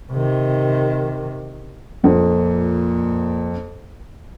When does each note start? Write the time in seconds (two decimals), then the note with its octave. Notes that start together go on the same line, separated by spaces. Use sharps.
0.12 C3 D#3
2.04 F2 A#2